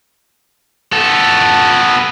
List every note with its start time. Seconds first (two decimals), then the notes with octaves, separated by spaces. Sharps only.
0.93 B3 A4